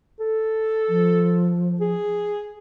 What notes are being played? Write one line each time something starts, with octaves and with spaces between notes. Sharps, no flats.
A4
F3
G#4